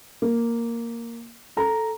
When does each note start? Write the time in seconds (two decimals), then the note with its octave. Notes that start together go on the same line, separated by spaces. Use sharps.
0.22 A#3
1.57 A4 A#5